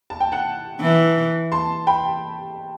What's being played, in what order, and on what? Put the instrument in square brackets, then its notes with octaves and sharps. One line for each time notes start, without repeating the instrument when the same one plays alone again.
[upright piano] A5
G5
F#5 A5
[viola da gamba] E3
[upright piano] A5 C6
G5 B5